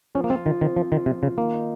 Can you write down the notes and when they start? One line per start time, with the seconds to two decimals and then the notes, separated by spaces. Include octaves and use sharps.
0.15 F3 C#4
0.24 A#3
0.30 C4 F4
0.45 D#3 F4
0.61 D#3 C4
0.76 F3 C4
0.92 D#3 F4
1.06 C3 F3
1.22 C#3 F4
1.37 D#3 A#3
1.53 D#4